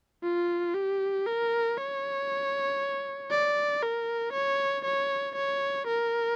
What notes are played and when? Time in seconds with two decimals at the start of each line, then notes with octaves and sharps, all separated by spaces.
0.24 F4
0.74 G4
1.26 A#4
1.78 C#5
3.31 D5
3.82 A#4
4.33 C#5
4.85 C#5
5.35 C#5
5.87 A#4